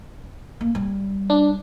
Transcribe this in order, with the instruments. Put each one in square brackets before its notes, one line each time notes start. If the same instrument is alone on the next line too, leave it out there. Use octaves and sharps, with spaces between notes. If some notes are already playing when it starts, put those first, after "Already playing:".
[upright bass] A#3
G3
[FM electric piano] D4